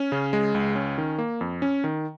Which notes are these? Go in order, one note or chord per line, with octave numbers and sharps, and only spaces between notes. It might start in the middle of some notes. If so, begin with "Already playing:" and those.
Already playing: C#4
C#3
G#3
C#2
C#4
D#3
A#3
F2
C#4
D#3